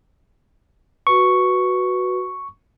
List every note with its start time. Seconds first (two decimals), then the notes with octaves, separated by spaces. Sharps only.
1.07 F#4 B4 C#6